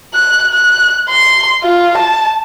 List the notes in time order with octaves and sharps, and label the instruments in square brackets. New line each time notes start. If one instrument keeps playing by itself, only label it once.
[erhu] F#6
F#6
C6
F4
A5